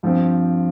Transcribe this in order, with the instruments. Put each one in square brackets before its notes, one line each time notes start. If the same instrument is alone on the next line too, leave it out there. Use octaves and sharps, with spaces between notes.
[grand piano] G2 F3 C4